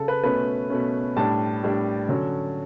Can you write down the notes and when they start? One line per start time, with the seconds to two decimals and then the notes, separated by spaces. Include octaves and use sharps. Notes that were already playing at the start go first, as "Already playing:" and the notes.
Already playing: C#3 A4
0.08 B4
0.23 B2 A3 C#4 B4
0.70 B2 A3 C#4
1.16 A2 G3 D4 A5
1.63 A2 G3 D4
2.09 D3 F#3 C#4